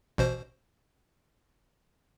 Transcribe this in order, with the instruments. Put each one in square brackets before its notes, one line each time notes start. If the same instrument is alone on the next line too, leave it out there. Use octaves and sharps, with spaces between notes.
[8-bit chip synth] A1 B2 C5